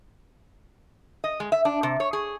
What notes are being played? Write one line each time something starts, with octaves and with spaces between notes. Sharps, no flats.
D#5
G#3
E5
D4
C3
C#5
G#4